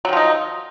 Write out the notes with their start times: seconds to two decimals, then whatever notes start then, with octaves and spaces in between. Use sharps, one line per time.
0.05 F#3
0.09 D#3
0.13 F3
0.17 D#4